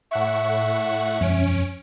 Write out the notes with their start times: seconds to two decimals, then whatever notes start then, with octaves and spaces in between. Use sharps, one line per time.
0.11 A2 E5 F#5 C#6
1.21 E1 F#2 F3 C#4 D7